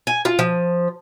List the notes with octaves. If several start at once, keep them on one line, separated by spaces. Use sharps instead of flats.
G#5
F4
F3